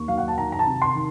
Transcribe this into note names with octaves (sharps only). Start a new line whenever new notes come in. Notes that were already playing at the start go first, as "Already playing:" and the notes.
Already playing: D#2 C#6
F#3 F5
F#5
A5
D#3 A#5
A#5
A5
C3
C6
D#3